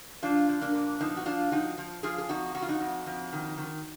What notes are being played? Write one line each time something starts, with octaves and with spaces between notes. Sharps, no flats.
F3 D4 F4
F3
A#3 D4
A#2
F3 B3 D#4
F#4
F3 D4 F4
F3 D#4 F#4
F3
F3 F4 G#4
G#4
F2 D#4 F#4
F2 F#4
F4
D#4 F#4
F2
F2
D#3
D#3